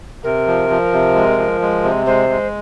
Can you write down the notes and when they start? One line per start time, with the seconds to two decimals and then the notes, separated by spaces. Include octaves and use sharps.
0.24 C3 A#4
0.47 F3
0.70 F3
0.93 C3
1.15 G#3
1.38 F3
1.61 G#3
1.83 C3
2.06 G#3 C5
2.29 G#3